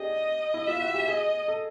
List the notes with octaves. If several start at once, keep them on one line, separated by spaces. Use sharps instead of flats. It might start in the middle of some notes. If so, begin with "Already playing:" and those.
Already playing: D4 G4 G#4 D#5
E4
F4 E5
F#4
G4
G#4 D#5
A4